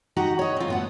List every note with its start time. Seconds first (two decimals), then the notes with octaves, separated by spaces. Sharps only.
0.16 D#4 F#4 G4 F#5 A#5
0.39 C#5 D#5
0.57 C4 F4
0.68 A2 B3 F#5